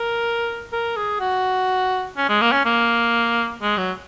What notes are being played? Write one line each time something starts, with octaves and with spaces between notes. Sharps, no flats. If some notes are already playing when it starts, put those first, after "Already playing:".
Already playing: A#4
A#4
G#4
F#4
C#4
G#3
A#3
C#4
A#3
G#3
F#3